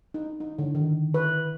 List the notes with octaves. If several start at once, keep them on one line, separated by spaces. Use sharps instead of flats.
D#4
D#4
D3
D#3
B4